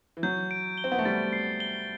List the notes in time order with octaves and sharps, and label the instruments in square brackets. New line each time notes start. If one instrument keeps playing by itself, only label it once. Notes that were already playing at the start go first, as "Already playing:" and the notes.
[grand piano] E3
[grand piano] F#3 [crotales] G6
[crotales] D7
G7
[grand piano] C4
B3
A3
[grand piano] G3 [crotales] A6
[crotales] C7
G7